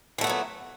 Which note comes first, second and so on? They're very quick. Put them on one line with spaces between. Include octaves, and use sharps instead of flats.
E3 A3 B3 F#3 A#2